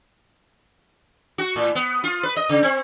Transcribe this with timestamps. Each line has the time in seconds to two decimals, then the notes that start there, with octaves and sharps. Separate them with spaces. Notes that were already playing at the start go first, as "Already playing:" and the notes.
1.38 F#4
1.56 A2
1.75 B3
2.04 F4
2.23 B4
2.36 D#5
2.49 C#3
2.63 C4